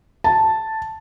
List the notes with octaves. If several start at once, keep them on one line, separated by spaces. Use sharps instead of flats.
A5